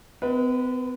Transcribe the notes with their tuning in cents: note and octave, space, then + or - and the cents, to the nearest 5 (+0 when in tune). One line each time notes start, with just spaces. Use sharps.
B3 +45 B4 -25 D#5 +30